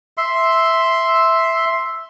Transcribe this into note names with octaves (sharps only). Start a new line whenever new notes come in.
E5 C6